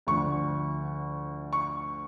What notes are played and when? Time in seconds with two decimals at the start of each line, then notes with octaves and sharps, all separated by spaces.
0.07 D2 D3 F3 C#6
1.53 C#6